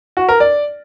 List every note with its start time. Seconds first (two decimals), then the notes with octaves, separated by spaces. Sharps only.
0.17 F#4
0.29 A#4
0.40 D5